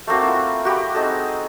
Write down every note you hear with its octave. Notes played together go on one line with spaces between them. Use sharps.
A3 A#3 C4 F#4
E4 F4
F#4 G4 B5
C4 D#4 G#4 A4